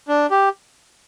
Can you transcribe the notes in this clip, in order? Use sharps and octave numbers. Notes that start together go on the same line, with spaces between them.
D4
G4